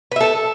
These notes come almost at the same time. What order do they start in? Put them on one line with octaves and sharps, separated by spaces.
B4 E5 A4